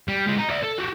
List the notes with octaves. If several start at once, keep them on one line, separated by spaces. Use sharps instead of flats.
G3
G#3 F4
D#4
D5 E5
A4
F#4 G4